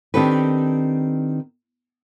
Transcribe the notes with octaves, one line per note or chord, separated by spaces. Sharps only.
D#3 C4 D4 G4 A4 B4